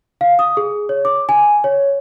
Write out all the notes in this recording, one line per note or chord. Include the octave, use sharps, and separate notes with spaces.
F5
D#6
G#4
C#5
D6
G#5
C#5